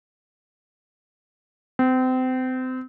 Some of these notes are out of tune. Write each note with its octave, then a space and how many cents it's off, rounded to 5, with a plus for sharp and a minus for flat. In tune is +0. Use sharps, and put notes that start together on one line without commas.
C4 -30